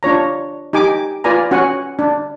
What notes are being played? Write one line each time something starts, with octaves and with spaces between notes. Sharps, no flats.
D4 F4 C#5 A#5
D#4 G4 G#5 D6
F4 B4 D5 G#5 A#5
C#4 F#4 F#5 G#5
D4